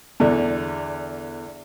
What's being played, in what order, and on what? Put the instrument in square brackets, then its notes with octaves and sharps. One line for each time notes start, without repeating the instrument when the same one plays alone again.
[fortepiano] E2 D3 D4